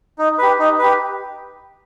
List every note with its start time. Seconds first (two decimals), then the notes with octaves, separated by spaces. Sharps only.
0.18 D#4
0.38 G4 B4
0.59 D#4
0.78 G4 B4